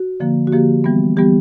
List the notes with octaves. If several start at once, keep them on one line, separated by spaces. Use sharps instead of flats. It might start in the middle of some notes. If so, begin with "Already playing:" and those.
Already playing: F#4
D3 F3 A#3
F#4
D3 F3 A#3 G4
E3 G3 B3
E3 G3 B3 G4